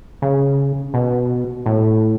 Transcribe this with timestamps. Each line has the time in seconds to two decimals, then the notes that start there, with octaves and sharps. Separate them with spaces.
0.22 C#3
0.94 B2
1.66 A2